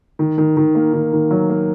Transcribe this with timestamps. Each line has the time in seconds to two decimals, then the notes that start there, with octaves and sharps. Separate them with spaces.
0.19 D#3
0.38 D#3
0.57 D#3
0.75 A#3
0.93 D#3
1.13 D#3
1.31 F#3
1.49 A#3